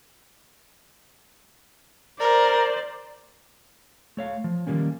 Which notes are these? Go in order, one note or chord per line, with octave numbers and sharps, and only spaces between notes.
A#4 C5 D5
A3 C#5 F5
F3
D#3 E3 G3 A#3 C#4